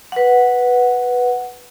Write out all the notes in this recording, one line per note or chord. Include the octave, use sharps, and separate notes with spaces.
B4 F#5